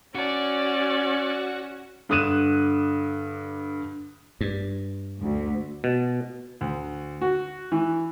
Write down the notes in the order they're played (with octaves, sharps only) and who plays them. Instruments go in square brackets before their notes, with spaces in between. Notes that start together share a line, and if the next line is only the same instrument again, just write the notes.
[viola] C#4 [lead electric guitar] F#4 [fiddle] D5
[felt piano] G2 D3 D#6 F#6 D#7 E7
[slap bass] G2
[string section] D2
[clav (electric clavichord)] B2
[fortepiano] D2
F#4
E3